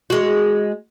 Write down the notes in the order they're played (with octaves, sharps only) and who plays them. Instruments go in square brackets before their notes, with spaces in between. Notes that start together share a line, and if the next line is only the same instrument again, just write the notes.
[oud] G#3 F#4